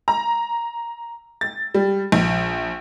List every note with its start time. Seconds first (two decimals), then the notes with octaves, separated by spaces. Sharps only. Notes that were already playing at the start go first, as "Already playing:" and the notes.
0.08 A#5
1.41 A6
1.74 G3
2.12 A#1